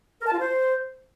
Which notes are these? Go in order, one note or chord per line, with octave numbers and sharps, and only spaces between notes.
A#4
A5
F4
C5